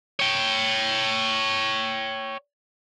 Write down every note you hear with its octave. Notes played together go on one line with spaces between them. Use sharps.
C#5 G5